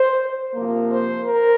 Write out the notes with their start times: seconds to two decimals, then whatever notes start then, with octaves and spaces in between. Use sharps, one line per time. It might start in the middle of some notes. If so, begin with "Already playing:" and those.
Already playing: C5
0.55 C3 F3 A#3
0.91 C5
1.25 A#4